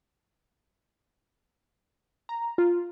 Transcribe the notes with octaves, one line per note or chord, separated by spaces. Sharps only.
A#5
F4